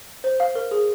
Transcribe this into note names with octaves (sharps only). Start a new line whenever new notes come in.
C5
F5
A#4
G#4